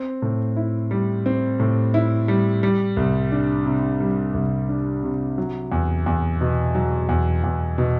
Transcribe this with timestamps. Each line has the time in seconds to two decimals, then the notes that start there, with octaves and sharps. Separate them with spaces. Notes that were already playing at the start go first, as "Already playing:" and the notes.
Already playing: C4
0.22 A2
0.56 E4
0.91 G3
1.26 C4
1.60 A2
1.94 E4
2.28 G3
2.63 G3
2.97 C2
3.32 D4
3.66 C3
4.00 G3
4.34 C2
4.69 D4
5.03 C3
5.38 F#3
5.72 E2
6.06 E2
6.41 B2
6.75 F#3
7.09 E2
7.44 E2
7.78 B2